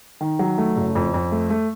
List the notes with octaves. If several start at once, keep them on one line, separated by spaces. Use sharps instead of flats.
D#3
F#3
A3
F#1
F2
F2
A3
A3